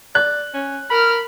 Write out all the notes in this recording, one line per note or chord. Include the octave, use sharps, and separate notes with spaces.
D5 F#6
C#4
A#4 B5 F6